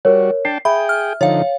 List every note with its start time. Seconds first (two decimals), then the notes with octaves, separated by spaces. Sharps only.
0.05 G3 F#4 A#4 C#5
0.45 D4 G5 A5 C7
0.65 G#4 E5 G5 B5
0.89 F6
1.21 D3 F3 D#4 C#5 F5